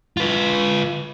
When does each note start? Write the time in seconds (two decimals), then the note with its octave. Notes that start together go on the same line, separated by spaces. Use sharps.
0.17 F4 B4